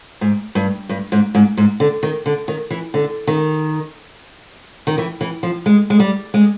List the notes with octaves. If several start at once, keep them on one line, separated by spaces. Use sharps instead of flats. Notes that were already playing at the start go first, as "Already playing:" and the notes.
G#2
G2
G2
G#2
G#2
G#2
D3
D#3
D3
D#3
E3
D3
D#3
D#3
E3
E3
F3
G#3
G#3
G3
G#3